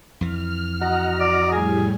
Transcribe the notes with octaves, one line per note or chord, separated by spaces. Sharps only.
F2 E3 F6
F#4 D#5 F#5 A#5
D5
A2 G3 G#4